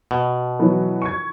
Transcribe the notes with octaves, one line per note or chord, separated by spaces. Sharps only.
B2
E3 F#3 B3
C#6 G#6